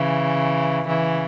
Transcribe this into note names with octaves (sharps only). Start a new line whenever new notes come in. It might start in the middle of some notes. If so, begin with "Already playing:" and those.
Already playing: C#3 E3
C#3 E3